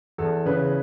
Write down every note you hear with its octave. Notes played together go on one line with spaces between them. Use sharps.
E2 A4
C#3 B4